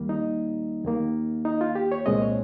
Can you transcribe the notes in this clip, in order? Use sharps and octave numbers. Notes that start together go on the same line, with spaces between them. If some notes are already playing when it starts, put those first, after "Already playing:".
Already playing: D#2 D#3 G3 A#3
D#4
D#2 D#3 A#3
D#4
F4
G4
C#5
C2 A#2 G#3 C4 D#5
C#5